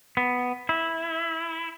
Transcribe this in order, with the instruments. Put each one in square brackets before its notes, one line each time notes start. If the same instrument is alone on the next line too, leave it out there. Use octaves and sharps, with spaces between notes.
[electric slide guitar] B3
E4